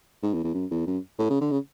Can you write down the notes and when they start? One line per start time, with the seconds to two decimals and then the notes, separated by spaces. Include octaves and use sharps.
0.23 G#2
0.34 E2
0.44 E2
0.55 F#2
0.71 E2
0.87 F#2
1.19 A2
1.30 C#3
1.41 D3
1.51 C#3